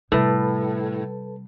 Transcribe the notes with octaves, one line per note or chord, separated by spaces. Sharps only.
A2 C3 G3 A4 B4 A5